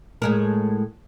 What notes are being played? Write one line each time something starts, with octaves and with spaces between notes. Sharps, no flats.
A2 G#3 A#4